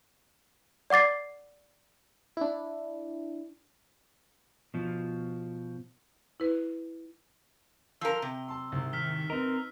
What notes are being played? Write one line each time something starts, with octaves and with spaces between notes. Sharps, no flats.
D5 F#5 D6 A6 C7
D4 E4
B2 F3
E4 B4
F3 A#4 E6
C3
A5 C6
C2 G#2
D#3 F6 B6 G7
C4 D#4 A#4 B4 D#5